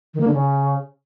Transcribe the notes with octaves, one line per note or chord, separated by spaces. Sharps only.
D#3
A#3
D3
C#3